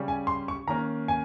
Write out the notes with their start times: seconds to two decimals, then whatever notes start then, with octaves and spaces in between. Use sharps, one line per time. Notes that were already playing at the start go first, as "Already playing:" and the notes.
Already playing: C#3 G3 C#4
0.08 G#5
0.27 C6
0.48 C#6
0.67 D#3 A#3 C#4 A#5
1.08 G#5